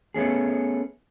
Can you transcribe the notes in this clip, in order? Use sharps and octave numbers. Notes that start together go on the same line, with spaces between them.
A3 B3 C#4 G#4